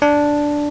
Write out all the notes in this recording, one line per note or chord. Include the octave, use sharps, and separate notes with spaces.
D4